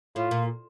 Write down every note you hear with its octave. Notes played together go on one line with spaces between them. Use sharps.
A2 F4
A#2